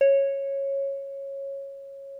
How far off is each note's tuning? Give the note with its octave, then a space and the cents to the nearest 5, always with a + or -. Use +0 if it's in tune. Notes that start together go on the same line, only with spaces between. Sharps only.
C#5 -10